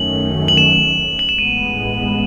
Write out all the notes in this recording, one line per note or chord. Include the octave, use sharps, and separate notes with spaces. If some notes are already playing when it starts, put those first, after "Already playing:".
Already playing: F#2 D#3 F#3 A3 C#4 F#7
F#7
E7
F#7
E7
A1 A2 G#3 B3 D#7